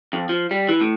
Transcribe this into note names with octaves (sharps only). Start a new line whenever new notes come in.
F2
F3
G3
E3
A2